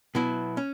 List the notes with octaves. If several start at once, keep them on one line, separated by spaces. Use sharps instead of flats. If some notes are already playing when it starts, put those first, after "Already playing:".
B2 F#3 B3 E4
C#4